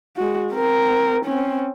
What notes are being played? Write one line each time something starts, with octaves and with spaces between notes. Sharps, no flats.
G#3 F#4
C4 A#4
C4 C#4